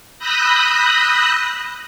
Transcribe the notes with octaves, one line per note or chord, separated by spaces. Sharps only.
B5 D#6 E6 F#6 G6 A#6